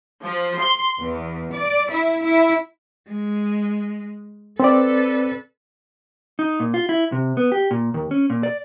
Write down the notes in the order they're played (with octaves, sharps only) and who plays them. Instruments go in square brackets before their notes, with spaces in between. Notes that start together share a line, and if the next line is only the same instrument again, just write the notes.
[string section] F3
C6
E2
D5
E4
E4
[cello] G#3
[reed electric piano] C4 D5 [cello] A4 B4
[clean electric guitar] D#4
A#2
F4
E4
C3
B3
G4
A#2
D#2
C#4
A#2
D5